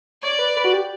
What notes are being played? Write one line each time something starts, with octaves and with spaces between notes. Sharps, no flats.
C#5 D5
B4
B4
F#4
G4